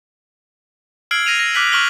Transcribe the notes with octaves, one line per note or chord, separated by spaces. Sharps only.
E6 F6 G#6 C7 D7 F#7
A#6 C7 D#7 F7
A#6
D6 F6 F#6 B6 F#7
C#6 F6 A#6 D7 F#7 G7